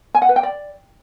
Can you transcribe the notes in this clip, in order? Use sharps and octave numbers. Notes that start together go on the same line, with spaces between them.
G#5
F#5
B4
G5
D5